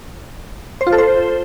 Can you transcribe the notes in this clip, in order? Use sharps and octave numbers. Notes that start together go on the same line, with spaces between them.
C5
F4
A4
C5